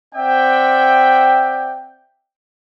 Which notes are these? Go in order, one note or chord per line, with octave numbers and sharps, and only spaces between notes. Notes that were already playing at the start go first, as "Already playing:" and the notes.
C4 D5 E5 F#5 G5